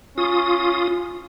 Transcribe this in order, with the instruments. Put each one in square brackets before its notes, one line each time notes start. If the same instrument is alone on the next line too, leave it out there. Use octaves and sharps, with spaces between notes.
[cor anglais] C#4 [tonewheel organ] F4 D#6